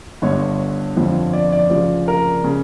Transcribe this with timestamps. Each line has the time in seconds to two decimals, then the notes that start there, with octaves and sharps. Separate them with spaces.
0.22 G1 G2 D3 C#5
0.96 G1 F2 D3 F3
1.33 D5
1.52 D5
1.70 D2 C#3 F3 D5
2.08 A#4
2.44 C#3